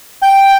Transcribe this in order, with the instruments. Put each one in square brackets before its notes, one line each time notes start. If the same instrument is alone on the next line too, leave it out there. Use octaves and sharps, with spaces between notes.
[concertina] G5